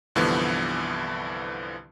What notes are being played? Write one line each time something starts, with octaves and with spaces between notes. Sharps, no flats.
C2 G2 D3 E3 F3 B3